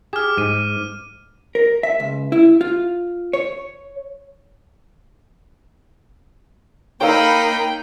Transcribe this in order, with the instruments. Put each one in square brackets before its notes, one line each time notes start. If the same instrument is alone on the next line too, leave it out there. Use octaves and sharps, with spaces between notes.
[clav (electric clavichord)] G4 G#4 [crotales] D6 F6
[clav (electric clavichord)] G#2 [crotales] F6 D#7
[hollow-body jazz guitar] A#4
E5
C#2
E4
F4
C#5
[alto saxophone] A#3 [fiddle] D#4 B5 [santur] C#5 F5 E6 [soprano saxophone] G5